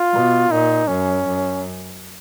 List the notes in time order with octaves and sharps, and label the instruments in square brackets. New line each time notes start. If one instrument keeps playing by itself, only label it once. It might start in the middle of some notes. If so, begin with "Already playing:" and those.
Already playing: [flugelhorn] F4
[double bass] B2
[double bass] A#2 [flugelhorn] D#4
[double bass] F#2 [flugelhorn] C#4
[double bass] F#2